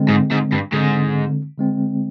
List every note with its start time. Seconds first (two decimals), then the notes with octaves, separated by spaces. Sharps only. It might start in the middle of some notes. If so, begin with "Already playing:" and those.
Already playing: D3 G#3 C4
0.09 G#2
0.31 G#2
0.52 G2
0.73 G#2 D3 G#3 C4
1.58 D3 G#3 C4